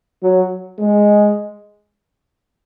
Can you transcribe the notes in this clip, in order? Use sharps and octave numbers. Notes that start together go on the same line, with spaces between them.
F#3
G#3